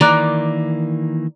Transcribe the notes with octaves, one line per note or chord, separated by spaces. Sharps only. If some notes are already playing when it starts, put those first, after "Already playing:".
D#3 E3 A#3 D5 A#5 D6 F#6